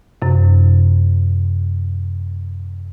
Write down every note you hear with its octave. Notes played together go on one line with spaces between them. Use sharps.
F#2 C3